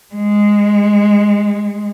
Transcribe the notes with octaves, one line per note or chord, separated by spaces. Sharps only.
G#3